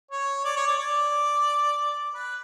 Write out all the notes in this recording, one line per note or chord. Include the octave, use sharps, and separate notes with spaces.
C#5
D5
C#5
D5
D5
B4